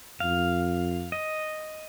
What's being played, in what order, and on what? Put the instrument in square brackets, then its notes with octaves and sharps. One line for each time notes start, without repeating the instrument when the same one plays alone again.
[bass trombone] F2 [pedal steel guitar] F5
[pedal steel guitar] D#5